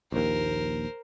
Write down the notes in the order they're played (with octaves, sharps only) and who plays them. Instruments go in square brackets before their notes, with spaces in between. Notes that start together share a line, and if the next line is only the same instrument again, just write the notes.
[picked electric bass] A#1 D#2 [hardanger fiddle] A#4 C5